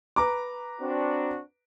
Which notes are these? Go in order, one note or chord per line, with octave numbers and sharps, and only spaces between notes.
B4 A#5 D6
C4 D4 F#4